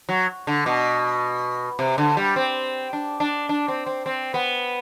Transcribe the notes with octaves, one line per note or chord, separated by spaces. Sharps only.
F#3
D3
B2
C3
D3
G3
C4
D4
D4
D4
C4
C4
C4
B3